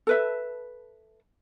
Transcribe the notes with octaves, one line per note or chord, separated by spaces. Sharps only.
A4 B4 E5